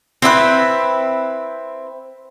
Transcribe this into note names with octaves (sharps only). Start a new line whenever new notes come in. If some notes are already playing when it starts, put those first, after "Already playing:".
C4 E4 G#4 B4